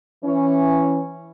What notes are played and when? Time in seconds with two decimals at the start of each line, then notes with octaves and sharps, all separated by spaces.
0.24 E3 C#4